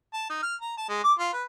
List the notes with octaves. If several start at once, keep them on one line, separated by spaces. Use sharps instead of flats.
A5
D#4
F6
A#5
A5
G#3
D6
F4
B4